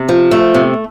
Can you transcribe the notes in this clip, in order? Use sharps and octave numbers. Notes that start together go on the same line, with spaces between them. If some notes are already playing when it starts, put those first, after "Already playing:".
Already playing: C3
F3
A3
C3